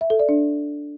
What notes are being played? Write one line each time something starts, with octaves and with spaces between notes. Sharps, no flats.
E5
A4
D5
D4